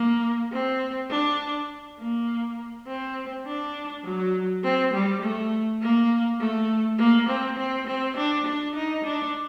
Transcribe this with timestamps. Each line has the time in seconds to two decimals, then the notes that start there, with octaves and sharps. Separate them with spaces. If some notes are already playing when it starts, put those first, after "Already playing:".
Already playing: A#3
0.52 C4
1.10 D4
2.00 A#3
2.87 C4
3.46 D4
4.05 F#3
4.63 C4
4.93 G3
5.22 A3
5.81 A#3
6.39 A3
6.98 A#3
7.29 C4
7.58 C4
7.87 C4
8.17 D4
8.46 D4
8.75 D#4
9.04 D4